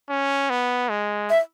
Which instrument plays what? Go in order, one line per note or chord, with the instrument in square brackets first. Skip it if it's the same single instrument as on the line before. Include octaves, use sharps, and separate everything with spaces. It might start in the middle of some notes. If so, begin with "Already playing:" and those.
[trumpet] C#4
B3
G#3
[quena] E5